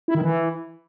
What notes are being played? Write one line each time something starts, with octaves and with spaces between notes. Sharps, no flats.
E4
D#3
E3